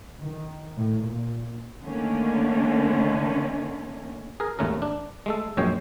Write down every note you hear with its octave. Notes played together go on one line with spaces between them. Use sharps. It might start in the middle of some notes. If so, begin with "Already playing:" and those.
D#3
A2
A#2
D3 D#3 A3 A#3 C#4
G#4 A#4
G#1 D#2 A3 C#4 A#4
D4
G#3 A3 A4
A#1 F#2 G#3 A#3 C#5 G5